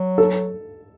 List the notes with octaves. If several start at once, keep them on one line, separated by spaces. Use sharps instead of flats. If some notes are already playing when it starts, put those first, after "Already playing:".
Already playing: F#3
A4